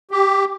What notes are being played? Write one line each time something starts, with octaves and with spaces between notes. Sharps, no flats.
G4